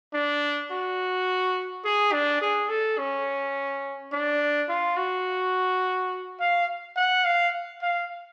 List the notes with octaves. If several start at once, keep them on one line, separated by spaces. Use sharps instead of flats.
D4
F#4
G#4
D4
G#4
A4
C#4
D4
F4
F#4
F5
F#5
F5
F5